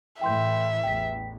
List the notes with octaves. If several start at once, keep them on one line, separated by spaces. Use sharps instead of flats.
A2 E3 E5 G5 C6 G6
A1 E2 G5 B6